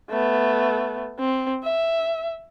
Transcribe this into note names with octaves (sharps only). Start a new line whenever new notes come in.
A3 B3
C4
E5